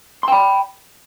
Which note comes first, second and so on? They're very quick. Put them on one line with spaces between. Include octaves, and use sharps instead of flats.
C6 G5 B5